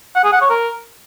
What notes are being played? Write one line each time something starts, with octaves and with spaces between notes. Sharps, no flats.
F#5
G#4
F#5
C#5
A#4